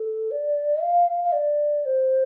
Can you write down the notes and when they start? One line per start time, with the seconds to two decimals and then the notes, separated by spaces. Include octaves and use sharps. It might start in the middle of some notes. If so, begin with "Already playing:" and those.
Already playing: A4
0.31 D5
0.82 F5
1.24 F5
1.33 D5
1.85 C5